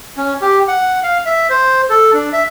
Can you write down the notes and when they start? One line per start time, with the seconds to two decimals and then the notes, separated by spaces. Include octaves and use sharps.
0.17 C#4
0.42 G4
0.68 F#5
1.03 F5
1.26 E5
1.50 C5
1.90 A4
2.13 D4
2.33 E5